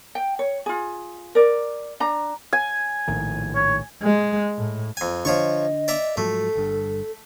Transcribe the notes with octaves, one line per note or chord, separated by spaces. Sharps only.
G5
C#5
F4 G#4
A#4 D5
D4 A#5
G#5
A#1 A2 D#3
C#5
G#3
A2
F2 G#5
D3 F3 D4 C#5 D#5 C#6
D5 E5 A#5
G#2 F3 F#3 A3 A4
G1 G2